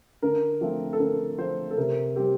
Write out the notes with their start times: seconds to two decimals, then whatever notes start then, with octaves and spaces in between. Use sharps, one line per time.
0.22 D3 A#4
0.61 F3 A3 C4
0.93 A4
0.99 D3 A#4
1.38 F3 A3 C4 C5
1.71 A4
1.77 C3 A#4
2.16 G3 C4 G4